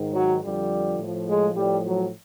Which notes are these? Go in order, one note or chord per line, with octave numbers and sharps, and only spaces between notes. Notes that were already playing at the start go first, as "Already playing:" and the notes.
Already playing: G#2 D#3
F#3
F2 D3 F3 G3
A2 F3
G#3
A2 F3 G3
F#3